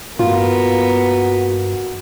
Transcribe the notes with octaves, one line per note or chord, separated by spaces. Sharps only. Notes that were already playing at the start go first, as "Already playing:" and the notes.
G2 A#3 B3 F4 F#4